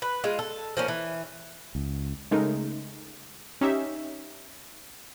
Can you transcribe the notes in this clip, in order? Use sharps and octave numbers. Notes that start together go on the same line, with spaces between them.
B4
G#3 F4
A4
F3 A#3 C#4
E3
C#2
C#3 G#3 A3 D#4 A#4
C#4 D#4 G4 E5